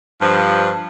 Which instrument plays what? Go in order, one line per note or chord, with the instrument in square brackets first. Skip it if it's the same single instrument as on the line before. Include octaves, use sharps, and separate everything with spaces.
[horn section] G2 F3